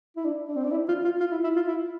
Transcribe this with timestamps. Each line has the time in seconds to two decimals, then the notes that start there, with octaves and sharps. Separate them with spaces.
0.16 E4
0.25 D4
0.48 D4
0.56 C4
0.64 D4
0.72 E4
0.88 F4
1.05 F4
1.20 F4
1.32 E4
1.44 E4
1.56 F4
1.68 E4